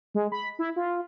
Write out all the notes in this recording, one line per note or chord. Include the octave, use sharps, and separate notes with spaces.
G#3
B5
E4
F4